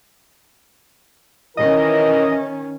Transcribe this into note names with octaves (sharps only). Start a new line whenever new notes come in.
D#3 E3 C#4 A#4 D#5